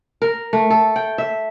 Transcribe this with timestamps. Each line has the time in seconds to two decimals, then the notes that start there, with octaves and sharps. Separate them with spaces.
0.22 A#4
0.53 A3
0.70 A4
0.96 G5
1.18 E5